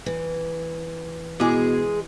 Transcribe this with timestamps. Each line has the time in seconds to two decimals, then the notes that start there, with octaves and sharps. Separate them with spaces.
0.06 E3
1.40 B2 G#3 E4 G#4 G#5 D6